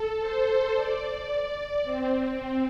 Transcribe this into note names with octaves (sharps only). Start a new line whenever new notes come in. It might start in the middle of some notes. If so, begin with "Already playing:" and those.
Already playing: A4
C5
D5
C4